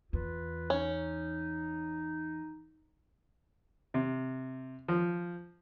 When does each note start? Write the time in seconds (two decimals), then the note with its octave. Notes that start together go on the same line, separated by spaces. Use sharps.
0.13 E2 F4 B4
0.70 C#4 D#4
3.94 C3
4.88 F3